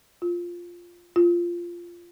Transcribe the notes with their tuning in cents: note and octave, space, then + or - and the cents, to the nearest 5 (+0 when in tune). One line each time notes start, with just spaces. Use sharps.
F4 +0
F4 -10